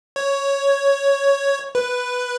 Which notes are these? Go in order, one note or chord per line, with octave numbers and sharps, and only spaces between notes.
C#5
B4